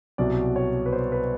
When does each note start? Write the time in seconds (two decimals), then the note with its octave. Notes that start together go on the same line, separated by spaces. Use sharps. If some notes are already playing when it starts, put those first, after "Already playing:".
0.18 C2 B2 F#3 D5
0.56 C#5
0.86 B4
0.92 C5
1.12 B4